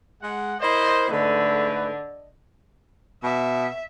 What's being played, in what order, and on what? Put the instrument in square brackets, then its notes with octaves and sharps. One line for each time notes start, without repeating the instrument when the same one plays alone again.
[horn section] G#3 F#5
[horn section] E4 A#4 C5 [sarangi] D#5
[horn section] G#2 A3 B4 [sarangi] D3
[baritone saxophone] B2 [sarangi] E5